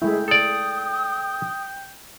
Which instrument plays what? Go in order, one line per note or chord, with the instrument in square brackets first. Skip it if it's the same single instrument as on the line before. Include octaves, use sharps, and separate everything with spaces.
[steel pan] G#3 A3 E4 [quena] G#4 [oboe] G5
[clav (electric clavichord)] A4 D5 [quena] D#6